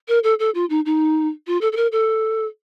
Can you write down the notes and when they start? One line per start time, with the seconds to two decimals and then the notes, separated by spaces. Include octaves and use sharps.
0.08 A#4
0.24 A4
0.39 A4
0.55 F4
0.70 D#4
0.86 D#4
1.47 F4
1.61 A4
1.72 A4
1.77 A#4
1.92 A4